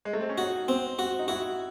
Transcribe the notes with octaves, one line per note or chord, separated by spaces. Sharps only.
G#3
A3
C4
C#4
D#4 F#4
C4
F#4
D#4
E4 F#4